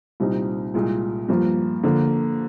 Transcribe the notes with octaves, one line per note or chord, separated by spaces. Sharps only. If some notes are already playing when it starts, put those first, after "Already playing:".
C2 A#2 G3 C4 D#4
C2 A#2 G#3
G2 F3 A#3 F4
D3 F3 A#3